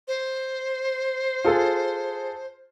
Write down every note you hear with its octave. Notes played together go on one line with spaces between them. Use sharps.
C5
F4 G#4 A4